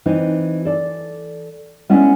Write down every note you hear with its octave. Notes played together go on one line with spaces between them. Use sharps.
E3 C4 D4 D#4
A4 D5
G#3 B3 C#4 D4 E4 F#5